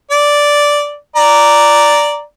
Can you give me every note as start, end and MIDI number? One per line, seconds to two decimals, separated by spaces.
0.11 0.96 74
1.16 2.22 74
1.16 2.22 82